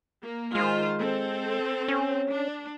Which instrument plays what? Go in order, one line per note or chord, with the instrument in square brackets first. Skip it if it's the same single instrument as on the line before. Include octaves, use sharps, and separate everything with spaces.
[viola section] A#3
[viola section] D#3 F4 C5 [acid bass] G#3
[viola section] C4 A4
[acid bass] C#4
[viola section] D4